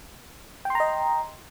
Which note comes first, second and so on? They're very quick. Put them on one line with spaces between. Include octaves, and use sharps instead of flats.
G5 C6 A#5 D#5